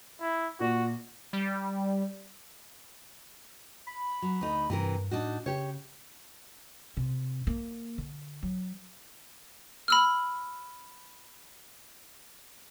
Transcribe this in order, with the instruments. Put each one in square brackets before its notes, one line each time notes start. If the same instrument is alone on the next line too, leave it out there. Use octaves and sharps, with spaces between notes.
[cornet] E4
[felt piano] A#2 [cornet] F#4
[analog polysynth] G3
[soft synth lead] B5
[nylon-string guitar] F#3
D2 D#4
[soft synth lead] G2 [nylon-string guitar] C3 E3 A#4
[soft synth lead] A2 [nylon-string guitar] D4 D#4 F#4
[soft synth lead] C#3 [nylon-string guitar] G4 C#5
[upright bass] C3
A#3
D3
F#3
[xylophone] B5 E6 F6